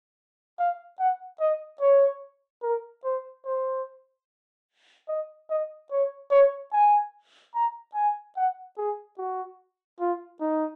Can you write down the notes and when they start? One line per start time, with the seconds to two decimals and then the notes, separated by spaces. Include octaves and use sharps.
0.59 F5
1.00 F#5
1.40 D#5
1.81 C#5
2.63 A#4
3.04 C5
3.45 C5
5.08 D#5
5.50 D#5
5.91 C#5
6.31 C#5
6.73 G#5
7.55 A#5
7.95 G#5
8.37 F#5
8.78 G#4
9.18 F#4
10.00 F4
10.41 D#4